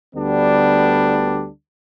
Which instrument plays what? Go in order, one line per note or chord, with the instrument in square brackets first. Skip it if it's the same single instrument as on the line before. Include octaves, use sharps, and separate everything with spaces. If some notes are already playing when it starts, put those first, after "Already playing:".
[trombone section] D2 D3 G3 B3 D4